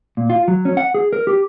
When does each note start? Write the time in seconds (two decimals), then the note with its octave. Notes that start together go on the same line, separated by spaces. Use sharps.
0.17 A#2
0.30 F4
0.48 F#3
0.65 C#4
0.77 F#5
0.94 G#4
1.13 A#4
1.27 G4